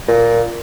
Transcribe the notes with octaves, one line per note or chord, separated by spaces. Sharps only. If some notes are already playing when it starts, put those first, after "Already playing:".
A#2